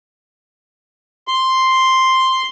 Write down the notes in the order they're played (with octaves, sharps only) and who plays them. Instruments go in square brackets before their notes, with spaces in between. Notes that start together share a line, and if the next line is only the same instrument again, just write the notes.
[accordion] C6